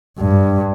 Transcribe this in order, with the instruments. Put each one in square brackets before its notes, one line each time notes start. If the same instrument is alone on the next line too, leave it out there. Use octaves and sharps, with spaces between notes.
[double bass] G2